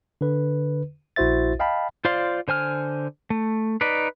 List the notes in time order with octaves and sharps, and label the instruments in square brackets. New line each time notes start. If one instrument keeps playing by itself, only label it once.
[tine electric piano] D3 B4
A#1 E4 F#4 C5 E5 A6
D#5 F5 G5 A5 B5
[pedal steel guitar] F4 C5 D5 F5 C6
D3 C5 G#5 F6
A3
D#4 B4 D5